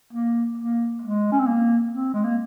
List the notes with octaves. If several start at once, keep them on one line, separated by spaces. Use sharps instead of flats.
A#3
A#3
G#3
C#4
C4
A#3
C4
G#3
A#3